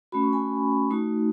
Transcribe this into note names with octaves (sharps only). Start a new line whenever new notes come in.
A3 C#4 F#4 B5
C#6
G#5 B5
A3 D#4 F#4